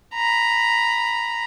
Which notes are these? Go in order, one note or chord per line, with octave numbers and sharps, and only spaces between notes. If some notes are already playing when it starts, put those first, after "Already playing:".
A#5 B5